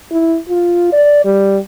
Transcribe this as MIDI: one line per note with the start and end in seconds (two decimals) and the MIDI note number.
0.11 0.36 64
0.49 0.90 65
0.93 1.23 74
1.25 1.58 55